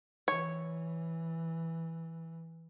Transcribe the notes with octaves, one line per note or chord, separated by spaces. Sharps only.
E3 C#5